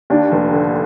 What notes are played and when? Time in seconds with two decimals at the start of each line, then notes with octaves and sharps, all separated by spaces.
0.10 D#2 D4
0.32 F1
0.52 D3